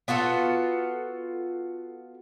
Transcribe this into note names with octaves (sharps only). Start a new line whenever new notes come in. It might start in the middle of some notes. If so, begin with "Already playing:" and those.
B3 F4 F#4 A4